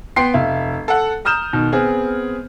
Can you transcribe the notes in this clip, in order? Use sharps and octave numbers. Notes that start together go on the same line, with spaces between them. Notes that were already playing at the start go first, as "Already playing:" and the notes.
B3 G5 C6 C7
F1 E5 F5
A4 F#5
A#5 D#6 F6 G6 E7
B2 D#3
B3 C4 G#4